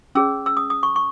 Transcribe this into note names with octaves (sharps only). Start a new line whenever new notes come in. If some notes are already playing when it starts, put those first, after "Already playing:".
C#4 G#4 C#5 E6
E6
D#6
D#6
C#6
C#6